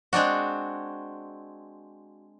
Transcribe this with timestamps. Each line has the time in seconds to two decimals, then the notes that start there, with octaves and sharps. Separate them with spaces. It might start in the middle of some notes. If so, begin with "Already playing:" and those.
0.13 G#3 C4 D4 F#4